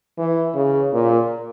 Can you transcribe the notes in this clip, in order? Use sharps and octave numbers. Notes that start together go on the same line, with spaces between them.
E3
C#3
A#2